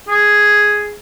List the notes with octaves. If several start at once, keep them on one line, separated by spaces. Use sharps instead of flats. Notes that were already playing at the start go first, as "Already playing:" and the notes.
G#4